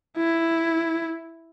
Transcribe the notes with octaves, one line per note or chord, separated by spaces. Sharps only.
E4